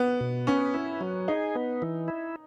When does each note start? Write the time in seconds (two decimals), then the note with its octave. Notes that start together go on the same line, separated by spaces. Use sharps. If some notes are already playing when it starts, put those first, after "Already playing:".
Already playing: B3
0.21 B2
0.47 B3 C#4
0.74 E4
1.01 F#3
1.28 D#4 G#4
1.55 B3
1.82 E3
2.08 E4